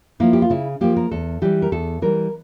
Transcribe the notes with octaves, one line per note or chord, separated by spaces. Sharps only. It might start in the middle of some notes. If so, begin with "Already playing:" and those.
F3 A#3 E4
G4
F4
C#3 E4
F3 A#3 G4
A#4
E2 A4
E3 G3 G4
A#4
E2 A4
E3 G3 A#4